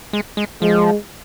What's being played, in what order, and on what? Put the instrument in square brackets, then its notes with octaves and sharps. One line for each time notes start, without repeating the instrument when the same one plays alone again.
[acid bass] G#3
G#3
[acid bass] F3 [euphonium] G#3